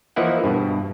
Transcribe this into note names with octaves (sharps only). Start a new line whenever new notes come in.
E3 F3 A#3 E4 D#5 F#5
G2 B2